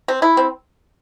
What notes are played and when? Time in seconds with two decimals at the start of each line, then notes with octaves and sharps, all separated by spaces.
0.08 C4
0.22 E4
0.37 C4